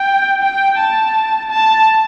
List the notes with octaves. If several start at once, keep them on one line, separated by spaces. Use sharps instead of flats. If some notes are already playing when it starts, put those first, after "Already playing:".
Already playing: G5
G5
A5
A5